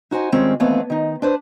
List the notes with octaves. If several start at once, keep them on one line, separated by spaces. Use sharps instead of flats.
D#4 F#4 C5 G#5
D#3 G3 G#3 C4 C#4 F4
D#2 E3 A3 B3 C4 F5
D#3 D#4
D4 B4 C5